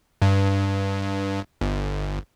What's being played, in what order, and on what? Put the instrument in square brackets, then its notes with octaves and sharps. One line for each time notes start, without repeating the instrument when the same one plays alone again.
[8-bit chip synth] G2
G1